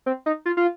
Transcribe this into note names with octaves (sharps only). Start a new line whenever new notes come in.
C4
D#4
F4
F4